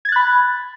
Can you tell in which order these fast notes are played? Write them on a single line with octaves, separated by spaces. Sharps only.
G#6 A6 F#6 B5